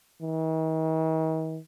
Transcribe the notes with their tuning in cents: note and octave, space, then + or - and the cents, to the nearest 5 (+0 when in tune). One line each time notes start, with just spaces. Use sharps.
D#3 +45